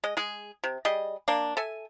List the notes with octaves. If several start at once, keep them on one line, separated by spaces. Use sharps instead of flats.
G#3 D#5
G#3 G#4
C3
G3 G#4 D#5
A#3 D4
A4 E5 G#5